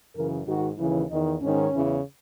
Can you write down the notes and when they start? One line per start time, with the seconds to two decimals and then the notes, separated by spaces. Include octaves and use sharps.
0.15 F#2 C#3 E3 A#4
0.47 G#2 D#3 F#4
0.78 D#2 C#3 E3
1.10 E2 D#3 D#4
1.42 G#2 D#3 C#4
1.73 E2 C#3 E3